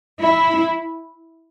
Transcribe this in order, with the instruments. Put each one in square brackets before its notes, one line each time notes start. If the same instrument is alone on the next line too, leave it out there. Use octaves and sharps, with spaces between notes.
[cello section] E4